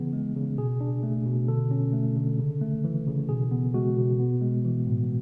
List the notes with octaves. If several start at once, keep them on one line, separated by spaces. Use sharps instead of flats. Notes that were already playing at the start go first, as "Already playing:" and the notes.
Already playing: C#3 E3 B3 G#4
G#3
C#3
B2 G#4
D4
A3
B2
D3 A4
C#4
A3
D3
C#3
A3
E3
C#3
B2 G#4
B3
G#3 F#4
B2
B3
G#3
E3
A2